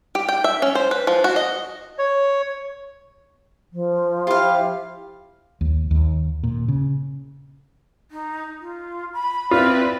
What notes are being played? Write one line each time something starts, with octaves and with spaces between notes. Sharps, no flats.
G4
G5
E5
C#4
C5
B4
F3
F#4
D#5
C#5
F3
E4 F4 G4 F5
D#2
D#2
A#2
C#3
D#4
F4
B5
C4 E4 F4 B4 D5